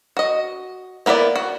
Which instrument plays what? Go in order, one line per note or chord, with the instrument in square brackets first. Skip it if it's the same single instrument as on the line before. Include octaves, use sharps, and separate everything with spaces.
[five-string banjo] F#4 D#5
A#3 B3 E4 B4 D5
F#4